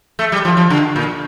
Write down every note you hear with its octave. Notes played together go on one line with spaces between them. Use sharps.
A3
G3
F3
F3
D3
A#2